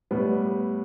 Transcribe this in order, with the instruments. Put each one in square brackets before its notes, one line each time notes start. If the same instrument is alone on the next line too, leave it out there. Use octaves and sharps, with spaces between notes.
[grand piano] A2 G3 B3